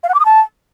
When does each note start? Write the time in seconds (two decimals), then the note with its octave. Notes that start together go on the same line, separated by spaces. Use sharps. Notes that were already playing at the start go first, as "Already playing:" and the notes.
0.03 F5
0.09 F#5
0.14 D6
0.20 D#6
0.25 A5